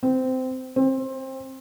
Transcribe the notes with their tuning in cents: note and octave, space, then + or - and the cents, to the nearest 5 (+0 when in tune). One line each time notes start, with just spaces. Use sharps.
C4 -20
C4 +25